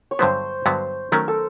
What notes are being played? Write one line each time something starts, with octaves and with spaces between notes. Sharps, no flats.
C#5
G2 D3 F#3 B3 C5
G2 D3 F#3 B3
D#3 F#3 A3 C#4 A#4
A4